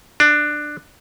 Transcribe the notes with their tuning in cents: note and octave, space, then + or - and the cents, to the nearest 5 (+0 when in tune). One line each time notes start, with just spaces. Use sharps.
D4 +15